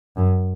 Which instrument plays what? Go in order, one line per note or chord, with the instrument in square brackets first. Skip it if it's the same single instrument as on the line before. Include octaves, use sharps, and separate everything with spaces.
[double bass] F#2